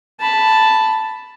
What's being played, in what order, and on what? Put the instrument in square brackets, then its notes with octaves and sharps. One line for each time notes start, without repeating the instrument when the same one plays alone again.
[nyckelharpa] A5 B5